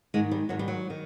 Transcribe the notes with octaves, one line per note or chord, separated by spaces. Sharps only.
G#2 D#3 G#3
G3
G#2 D#3 F#3
G3
F#3
D#3